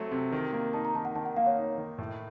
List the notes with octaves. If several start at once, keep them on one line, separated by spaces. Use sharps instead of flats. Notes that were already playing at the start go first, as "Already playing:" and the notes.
Already playing: F#3 A3 C4
C3
D#3
A#3
D#4 A5
A#5
D#3 A5
F#5
D#3 A5
F#5
A#3 F5
C#5
D#4
D#3
A2